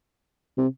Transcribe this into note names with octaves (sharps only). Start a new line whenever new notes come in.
C3